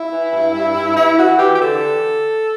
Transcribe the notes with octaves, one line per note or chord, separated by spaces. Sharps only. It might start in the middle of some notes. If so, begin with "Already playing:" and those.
Already playing: E4
E3
G2
G2
G2
E3 E4
E3 F#4
E3 G4
G4
D3 A4